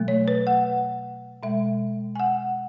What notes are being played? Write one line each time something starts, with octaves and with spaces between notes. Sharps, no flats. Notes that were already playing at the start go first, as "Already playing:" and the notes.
Already playing: B2 F#3 A3
C#5
B4
F#5
B2 G#3 E5
G#5
F#5